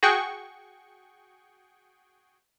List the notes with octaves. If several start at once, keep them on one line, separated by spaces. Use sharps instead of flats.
F#4 G#4 G5 C#6